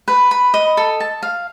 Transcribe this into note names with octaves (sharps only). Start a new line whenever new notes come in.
B4
B5
D#5
A4
A5
F5